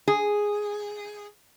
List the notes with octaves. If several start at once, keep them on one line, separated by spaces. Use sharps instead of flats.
G#4